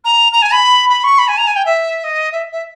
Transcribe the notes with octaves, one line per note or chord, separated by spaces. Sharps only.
A#5
A#5
G#5
B5
B5
C#6
B5
G#5
A#5
G#5
G5
E5
D#5
E5
E5